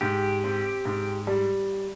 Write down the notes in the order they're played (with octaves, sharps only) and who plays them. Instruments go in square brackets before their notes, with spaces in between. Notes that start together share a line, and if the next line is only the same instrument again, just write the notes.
[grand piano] G#2 [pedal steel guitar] G4
[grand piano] C4
G#2
G3